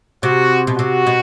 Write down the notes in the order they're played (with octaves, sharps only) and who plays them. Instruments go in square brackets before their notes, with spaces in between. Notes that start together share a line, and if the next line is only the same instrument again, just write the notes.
[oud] C3 [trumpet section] F#4
[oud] B2
[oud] C3 [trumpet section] F#4
[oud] B2